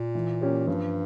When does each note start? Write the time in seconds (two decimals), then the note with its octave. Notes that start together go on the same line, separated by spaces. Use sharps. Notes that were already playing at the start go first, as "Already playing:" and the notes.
Already playing: A#2
0.15 E3
0.41 A#3 C#4 G4 C#5
0.67 G2 F3